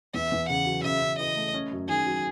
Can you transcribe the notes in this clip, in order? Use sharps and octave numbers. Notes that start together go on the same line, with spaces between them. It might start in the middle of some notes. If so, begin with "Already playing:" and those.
E2 E5
E2
C#3 F#5
F#3
C#3 E5
C#3
E3 D#5
A3
C#4
F#2
D#3 G#4
F#3